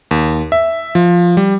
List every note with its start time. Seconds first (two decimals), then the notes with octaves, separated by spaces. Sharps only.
0.11 D#2
0.52 E5
0.95 F3
1.37 G3